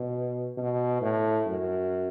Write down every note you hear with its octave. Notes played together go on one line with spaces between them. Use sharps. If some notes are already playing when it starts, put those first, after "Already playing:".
Already playing: B2
B2
A2
F#2